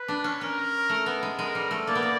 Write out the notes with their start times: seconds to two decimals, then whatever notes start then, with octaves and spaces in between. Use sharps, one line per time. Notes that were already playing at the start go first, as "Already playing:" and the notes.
Already playing: B4
0.08 D4
0.24 C#4
0.41 C#4 A#4
0.90 A3
1.06 B3
1.23 G#3
1.39 G#3 A#4
1.55 G3
1.71 A3
1.87 A#3 D5
1.95 B3
2.02 A#3